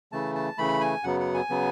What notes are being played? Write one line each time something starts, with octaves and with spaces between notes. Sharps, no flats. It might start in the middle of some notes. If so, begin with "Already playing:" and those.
C#3 E3 A3 A5
A5
C#3 E3 A3 B5
G#5
F#2 C#3 F#3 B3 F#5
F#5
G#5
C#3 F#3 B3